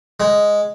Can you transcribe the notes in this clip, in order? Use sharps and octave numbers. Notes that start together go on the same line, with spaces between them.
G#3